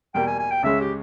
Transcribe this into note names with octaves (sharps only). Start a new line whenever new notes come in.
E2 B2 G3 A#3 G5
G#5
G#5
G5
C#2 C#3 G#3 C#4 E5
G4